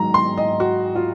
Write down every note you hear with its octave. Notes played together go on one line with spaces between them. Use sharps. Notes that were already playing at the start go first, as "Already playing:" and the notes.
Already playing: G#2 D#3 F#3 A#5
C6
D#5
F#4
F4